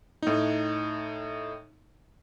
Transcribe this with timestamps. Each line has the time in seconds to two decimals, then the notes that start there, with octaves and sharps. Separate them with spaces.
0.22 A2 D#4